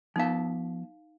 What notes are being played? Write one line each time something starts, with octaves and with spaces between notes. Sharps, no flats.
F3 B3 D#4 F5 A5